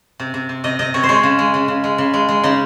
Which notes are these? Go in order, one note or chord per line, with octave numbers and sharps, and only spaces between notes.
C3
C3
C3
C3 D#5
C3 D#5
C3 C#5
C5
G#3 C#5
C#3
G#3
C#3
C#3
G#3
C#3
G#3
G#3
C#3 D#4